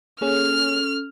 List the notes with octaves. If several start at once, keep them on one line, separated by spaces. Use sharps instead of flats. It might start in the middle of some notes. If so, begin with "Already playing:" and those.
A#3 C#4 G#4 A4 C#5 F6